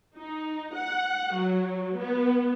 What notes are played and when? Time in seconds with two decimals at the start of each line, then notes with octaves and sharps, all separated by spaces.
0.15 D#4
0.74 F#5
1.34 F#3
1.96 B3